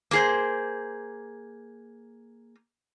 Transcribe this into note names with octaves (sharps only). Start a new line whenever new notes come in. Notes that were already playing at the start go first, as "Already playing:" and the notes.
A#3 G#4 C5